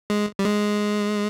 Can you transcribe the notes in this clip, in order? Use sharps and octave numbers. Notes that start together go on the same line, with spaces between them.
G#3
G3
G#3